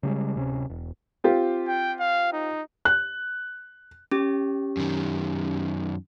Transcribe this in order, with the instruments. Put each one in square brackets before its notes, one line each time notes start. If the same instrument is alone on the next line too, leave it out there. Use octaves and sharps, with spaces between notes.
[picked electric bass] C#3 G3 G#3
D1 C3 C#4
E1
[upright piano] C4 F4 G4
[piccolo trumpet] G5
F5
D#4
[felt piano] F#6
[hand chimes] C#4 G4
[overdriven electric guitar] F#2 D#3